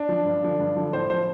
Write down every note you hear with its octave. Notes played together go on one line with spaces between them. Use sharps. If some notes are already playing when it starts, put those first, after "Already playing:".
Already playing: D4
F3
G2
D3 F3
G2
D3 F3
A2 C5
F3 C5